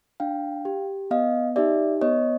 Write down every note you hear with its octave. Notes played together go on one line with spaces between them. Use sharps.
D4 F5 G5
G4
B3 D#5 F5
D#4 G4 D5 E5
B3 C#5 D#5